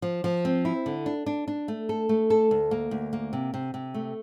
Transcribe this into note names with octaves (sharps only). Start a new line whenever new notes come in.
F3
F3
C4
E4
D3
D4
D4
D4
A3
A4
A3
A4
D2
A#3
D2
A#3
C3
C3
C3
A3